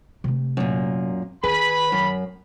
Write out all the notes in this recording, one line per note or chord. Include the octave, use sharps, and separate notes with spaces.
C3 A3
F#2 A#2
D#3 G#4 B4 B5
F#2